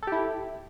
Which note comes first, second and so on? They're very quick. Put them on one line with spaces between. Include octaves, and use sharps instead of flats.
A4 G4 E4